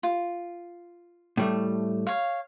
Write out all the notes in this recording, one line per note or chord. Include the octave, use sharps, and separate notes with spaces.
F4
A2 G3 A3
C#5 F5